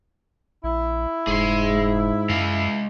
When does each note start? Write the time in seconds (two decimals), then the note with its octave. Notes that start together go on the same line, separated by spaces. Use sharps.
0.64 A#1 E4
1.27 F1 G#2 G#4 C6
2.29 F#2 G#3 F5